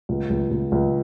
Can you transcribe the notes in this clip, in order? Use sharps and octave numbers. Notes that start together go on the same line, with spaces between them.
C#2
C#2
C#2
C#2